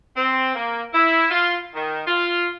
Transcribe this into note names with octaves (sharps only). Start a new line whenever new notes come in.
C4
A#3
E4
F4
D#3
F4